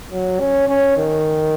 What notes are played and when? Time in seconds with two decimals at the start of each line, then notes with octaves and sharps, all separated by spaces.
0.11 F#3
0.40 C#4
0.68 C#4
0.98 D#3